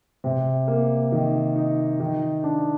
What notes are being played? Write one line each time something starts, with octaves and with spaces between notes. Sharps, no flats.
C3
A#3
D#3
D#4
D#3
D4